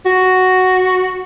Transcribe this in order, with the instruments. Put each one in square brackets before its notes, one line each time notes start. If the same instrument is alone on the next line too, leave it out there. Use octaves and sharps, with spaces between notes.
[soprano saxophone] F#4